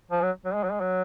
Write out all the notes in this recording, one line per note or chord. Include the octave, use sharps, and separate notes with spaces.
F3
F#3
F#3
G#3
F#3
G#3
F#3